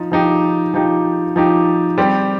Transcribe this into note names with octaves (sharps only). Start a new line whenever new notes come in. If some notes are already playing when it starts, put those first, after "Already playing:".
Already playing: F3 D#4
F3 D#4 G4
F3 D#4 G4
F3 D#4 G4
G3 C4 G4